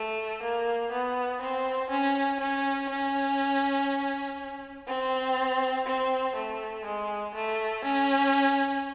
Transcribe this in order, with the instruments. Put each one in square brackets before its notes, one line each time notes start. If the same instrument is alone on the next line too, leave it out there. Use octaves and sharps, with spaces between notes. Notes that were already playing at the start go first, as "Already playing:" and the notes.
Already playing: [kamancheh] A3
A#3
B3
C4
C#4
C#4
C#4
C4
C4
A3
G#3
A3
C#4